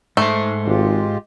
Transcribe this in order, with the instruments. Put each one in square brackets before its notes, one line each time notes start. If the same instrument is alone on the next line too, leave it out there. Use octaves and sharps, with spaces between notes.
[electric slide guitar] G#2 C5 [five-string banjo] A3
[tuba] G#1 [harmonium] G#3 F4 G4